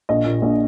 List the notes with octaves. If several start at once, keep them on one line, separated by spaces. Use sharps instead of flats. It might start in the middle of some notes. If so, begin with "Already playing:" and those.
A#1 D#5
A#2
A#1